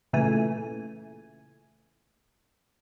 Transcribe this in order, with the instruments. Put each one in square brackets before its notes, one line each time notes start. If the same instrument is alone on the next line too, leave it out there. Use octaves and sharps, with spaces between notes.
[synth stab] A#2 C#3 E3 A3 G#5